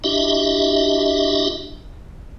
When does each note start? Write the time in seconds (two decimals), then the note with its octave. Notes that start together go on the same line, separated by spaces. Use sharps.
0.04 D4 E4 F#4 G4 D#5 E5